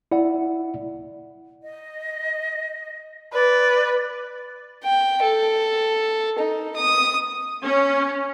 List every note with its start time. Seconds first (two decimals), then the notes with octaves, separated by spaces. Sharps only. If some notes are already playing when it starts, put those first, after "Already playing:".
0.12 E4 D5 F#5
1.63 D#5
3.33 B4 D5
4.84 G5
5.22 A4
6.38 D#4
6.76 D#6
7.64 C#4